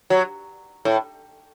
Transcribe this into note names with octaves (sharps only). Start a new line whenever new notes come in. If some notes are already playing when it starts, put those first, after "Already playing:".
F#3
A2